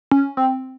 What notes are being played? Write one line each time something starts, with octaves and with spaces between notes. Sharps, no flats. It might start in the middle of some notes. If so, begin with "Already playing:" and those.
C#4
C4